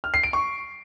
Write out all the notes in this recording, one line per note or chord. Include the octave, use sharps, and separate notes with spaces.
F6
C7
D7
C#6